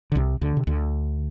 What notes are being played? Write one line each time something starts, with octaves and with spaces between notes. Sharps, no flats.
D3
C2 C3
D2 D3
C3
D2 D3